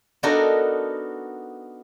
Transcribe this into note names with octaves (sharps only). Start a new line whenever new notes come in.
B3 D4 D#4 F#4 A4 A#4